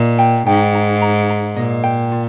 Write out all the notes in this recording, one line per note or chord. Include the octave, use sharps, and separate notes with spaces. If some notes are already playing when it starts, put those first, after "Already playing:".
Already playing: A#2 D#5
G5
G#2 G5
A#5
A#5
A#5
A#2 D#5
G5
F4